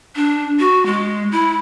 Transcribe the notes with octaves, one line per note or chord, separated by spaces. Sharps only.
D4
F#4
G#3
E4